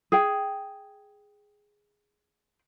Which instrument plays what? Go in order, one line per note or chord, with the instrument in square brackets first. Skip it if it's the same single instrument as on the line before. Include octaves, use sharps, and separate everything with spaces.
[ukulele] G#4 G5